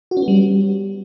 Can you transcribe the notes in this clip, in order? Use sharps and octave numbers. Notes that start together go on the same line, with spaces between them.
F#4
C#4
B3
G3